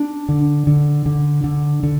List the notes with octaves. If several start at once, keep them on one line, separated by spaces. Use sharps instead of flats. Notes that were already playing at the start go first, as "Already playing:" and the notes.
Already playing: D4
D3
D3
D3
D3
D3